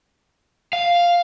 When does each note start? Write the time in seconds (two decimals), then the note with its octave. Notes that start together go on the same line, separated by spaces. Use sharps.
0.73 F5